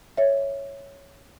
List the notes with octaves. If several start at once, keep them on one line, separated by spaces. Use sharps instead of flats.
C#5 E5